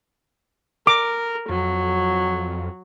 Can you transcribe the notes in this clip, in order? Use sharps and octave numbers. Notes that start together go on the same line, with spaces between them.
A#4 D6
F2 F#3